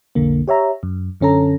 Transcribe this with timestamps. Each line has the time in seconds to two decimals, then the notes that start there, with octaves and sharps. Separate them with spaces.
0.15 B1 F2 D3 A#3
0.48 G4 C#5 E5 A#5
0.83 F#2
1.20 F#2 D3 C#4 A4 A#5